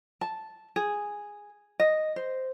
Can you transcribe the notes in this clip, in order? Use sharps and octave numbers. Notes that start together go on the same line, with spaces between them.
A5
G#4
D#5
C5